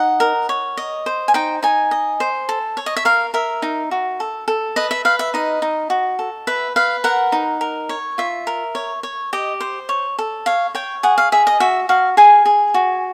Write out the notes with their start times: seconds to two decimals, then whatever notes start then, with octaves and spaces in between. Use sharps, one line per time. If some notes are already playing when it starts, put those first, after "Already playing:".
Already playing: D#4 D#5 F#5
0.20 A#4
0.49 C#5
0.77 D#5
1.06 C5
1.28 G#5
1.34 D#4 G5
1.63 D#4 G#5
1.91 D#5
2.20 C5
2.49 A4
2.77 C#5
2.86 D#5
2.96 E5
3.05 A#4 F5
3.34 A#4 E5
3.62 D#4
3.91 F#4
4.20 A4
4.48 A4
4.76 B4 D#5
4.91 E5
5.05 B4 F5
5.19 E5
5.34 D#4 D#5
5.62 D#4
5.90 F#4
6.19 A4
6.47 B4 E5
6.76 B4 F5
7.04 A#4 F#5
7.32 D#4
7.61 A#4
7.89 C#5
8.18 F4 E5
8.47 A#4
8.75 C#5
9.03 C#5
9.33 G4 D#5
9.60 C5
9.89 C#5
10.19 A4
10.46 C#5 F5
10.75 C#5 G5
11.03 G#4 F#5
11.18 F5
11.32 G#4 E5
11.47 D#5
11.60 F#4 E5
11.89 F#4 F5
12.17 G#4 G#5
12.46 G#4
12.74 F#4